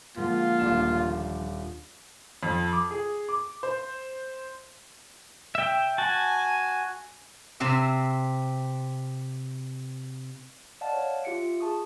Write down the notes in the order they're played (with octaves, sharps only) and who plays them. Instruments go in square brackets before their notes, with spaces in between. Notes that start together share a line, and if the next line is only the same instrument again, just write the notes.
[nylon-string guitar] D3 F3 G#3 [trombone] A#3 [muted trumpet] F4
[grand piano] D#1 D4 E7
[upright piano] F2
D6
G#4
D6
C5
[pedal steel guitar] E5 G5
[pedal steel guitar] F#4 A5 [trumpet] G#5
[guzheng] C3 C4 E5
[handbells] D5 D#5 F5 F#5 A5
C#5
F4 G4 E5 C#7 D7
G#4 A5 C#6 D#6